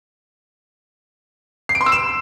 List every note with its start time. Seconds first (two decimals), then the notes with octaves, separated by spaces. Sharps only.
1.69 C7
1.75 D7
1.81 C6
1.86 E6
1.92 E7